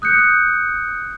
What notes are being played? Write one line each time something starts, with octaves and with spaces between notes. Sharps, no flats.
D#6 F#6 G6 C#7